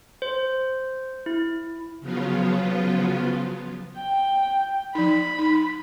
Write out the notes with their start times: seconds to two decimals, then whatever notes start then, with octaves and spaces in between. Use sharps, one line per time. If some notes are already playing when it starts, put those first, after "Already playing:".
0.22 C5
1.26 E4
2.00 C#3 F3 F#3 B3 F4
3.97 G5
4.95 F3 D#4 B5
5.39 D#4